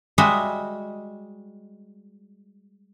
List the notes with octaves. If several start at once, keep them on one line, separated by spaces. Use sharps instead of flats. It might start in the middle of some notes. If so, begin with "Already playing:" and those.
G3 G#3 F#4 D#5 E5